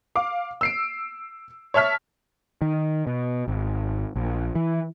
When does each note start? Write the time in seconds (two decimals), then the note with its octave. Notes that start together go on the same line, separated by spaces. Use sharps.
0.15 F5 D6
0.61 E6 C7 D7
1.74 C#5 E5 A5 F6 B6
2.62 D#3
3.07 B2
3.48 G#1
4.16 A#1
4.55 E3